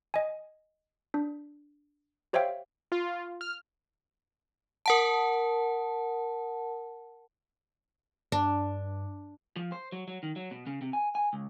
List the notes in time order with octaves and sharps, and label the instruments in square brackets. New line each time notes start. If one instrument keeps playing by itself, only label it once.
[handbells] D#5 G#5
D4
G4 C5 C#5 E5 F5 G5
[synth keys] F4
F6
[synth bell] A#4 F#5 A5
[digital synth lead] G2 [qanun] D4
[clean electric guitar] F3
C5
F#3
F#3
D#3
F#3
B2
C#3
C3
G#5
G#5
C#2